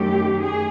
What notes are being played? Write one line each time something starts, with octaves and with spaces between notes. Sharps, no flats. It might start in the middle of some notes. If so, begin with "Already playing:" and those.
Already playing: F#2 D#3 F#3 A3 G4
G#4